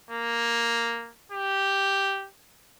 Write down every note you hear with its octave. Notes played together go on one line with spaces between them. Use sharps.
A#3
G4